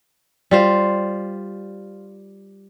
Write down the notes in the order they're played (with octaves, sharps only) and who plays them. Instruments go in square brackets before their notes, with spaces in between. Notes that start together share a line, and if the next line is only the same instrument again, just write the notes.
[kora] G3 F4 C5